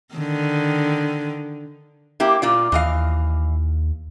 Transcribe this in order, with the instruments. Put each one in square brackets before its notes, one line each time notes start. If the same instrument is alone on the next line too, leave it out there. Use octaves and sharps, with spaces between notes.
[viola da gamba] D3 D#3
[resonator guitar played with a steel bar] A#3 E4 G4
A#2 F4 D5
[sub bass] D#2 [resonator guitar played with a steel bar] E3 D#5 F5